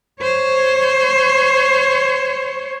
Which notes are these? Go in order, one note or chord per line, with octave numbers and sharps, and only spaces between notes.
C5 C#5